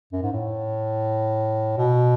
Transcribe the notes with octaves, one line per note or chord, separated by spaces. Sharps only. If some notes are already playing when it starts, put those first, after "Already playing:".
F#2
G#2
A2
B2